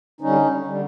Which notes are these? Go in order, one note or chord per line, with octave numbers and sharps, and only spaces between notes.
D3 G3 C#4 D#4
D3 G3